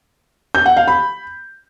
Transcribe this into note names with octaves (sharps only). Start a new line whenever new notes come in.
G6
F#5
F5
B5